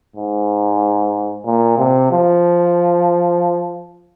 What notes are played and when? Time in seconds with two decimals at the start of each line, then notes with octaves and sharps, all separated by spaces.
0.16 G#2
1.46 A#2
1.78 C3
2.11 F3